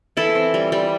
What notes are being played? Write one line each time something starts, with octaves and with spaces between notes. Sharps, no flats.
E3 E4 A4
C4
G3
G3